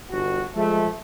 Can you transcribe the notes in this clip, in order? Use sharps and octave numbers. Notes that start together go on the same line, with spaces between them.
G1 F#4
F3 G#3 A3